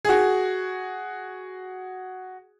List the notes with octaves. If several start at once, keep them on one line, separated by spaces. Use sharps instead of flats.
F#4 G#4